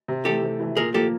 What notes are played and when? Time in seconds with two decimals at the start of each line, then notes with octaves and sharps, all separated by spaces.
0.08 C3
0.25 E3 A3 G4 A4
0.42 C3
0.60 E3 A3
0.77 A#2 G#4 A#4
0.94 F3 A#3 G4 A4